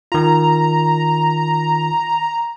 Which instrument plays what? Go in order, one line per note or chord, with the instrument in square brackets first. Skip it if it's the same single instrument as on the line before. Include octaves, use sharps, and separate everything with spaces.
[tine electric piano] D#3 F4 [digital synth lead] A#5